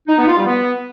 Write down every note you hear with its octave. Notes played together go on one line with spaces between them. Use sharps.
D#4
B3
F4
G3
B3